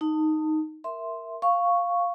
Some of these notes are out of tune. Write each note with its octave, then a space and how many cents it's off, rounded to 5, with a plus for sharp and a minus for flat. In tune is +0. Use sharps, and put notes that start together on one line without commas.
D#4 +0 A5 +25
A#4 +0 E5 +0 C6 +0
F5 +0 C#6 +0